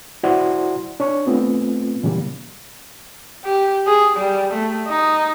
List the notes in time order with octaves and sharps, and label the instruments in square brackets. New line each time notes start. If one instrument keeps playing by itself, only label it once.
[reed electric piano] E4 F#4 C5 D5 F#5 C6
D4 C#5 C#6
A3 B3 C4 F4
A#2 C#3 E3 G3 A#3
[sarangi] G4
G#4
G3
A3
D#4